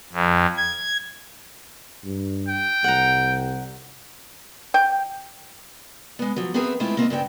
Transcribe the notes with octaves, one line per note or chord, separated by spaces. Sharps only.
F2
G#6
G2
G5
C2 F#5 A#5
G5
G#3 B3
F3 F#3
B3 C4 G#4 A#4 B4 E5
G#3 A3 C4 E4 F4
A#3 C4 A4 D#5
G2 C#3 C4 G5